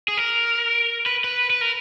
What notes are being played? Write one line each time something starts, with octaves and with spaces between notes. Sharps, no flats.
G#4
A#4
B4
B4
B4
A#4